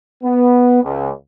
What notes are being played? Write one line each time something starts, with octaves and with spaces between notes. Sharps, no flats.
B3
C#2